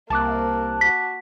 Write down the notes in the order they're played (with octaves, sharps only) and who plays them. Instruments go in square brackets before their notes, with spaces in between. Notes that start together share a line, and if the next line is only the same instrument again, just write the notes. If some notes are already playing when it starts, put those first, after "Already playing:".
[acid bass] C2 [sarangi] A#3 [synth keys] A5 D6 F#6
[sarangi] F#4 [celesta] B6